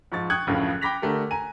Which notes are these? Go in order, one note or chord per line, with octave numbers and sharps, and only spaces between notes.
G#2 F3 C#6 A6
G5 C#6 D#6 F#6 G#6 C#7
F#1 D2 A2 C#3 F3 F5
G5 B5 D6 A#6 B6 F7
D3 A3 G4 A#4
G#5 A#5 D#7